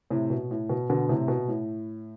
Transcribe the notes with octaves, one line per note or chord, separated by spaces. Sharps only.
A2 C3
B2
A2
B2
B2 D3
A2 C3
B2
A2